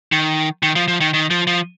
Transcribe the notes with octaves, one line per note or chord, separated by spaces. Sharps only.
D#3
D#3
F3
F3
D#3
D#3
F3
F3